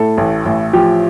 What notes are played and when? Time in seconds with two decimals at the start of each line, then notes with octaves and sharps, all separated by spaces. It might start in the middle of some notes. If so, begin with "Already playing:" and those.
Already playing: A2 A4
0.18 A1
0.46 A1
0.73 F3 G4